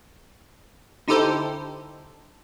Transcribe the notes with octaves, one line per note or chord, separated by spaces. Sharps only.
D3 D#4 E4 G4 A4 C5